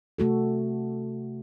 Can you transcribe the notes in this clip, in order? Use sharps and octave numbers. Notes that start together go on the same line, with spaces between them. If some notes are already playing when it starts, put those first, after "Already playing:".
C3 A3 F#4 A4